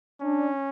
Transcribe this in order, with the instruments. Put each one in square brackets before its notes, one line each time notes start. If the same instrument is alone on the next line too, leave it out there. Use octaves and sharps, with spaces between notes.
[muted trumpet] C#4 [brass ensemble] D4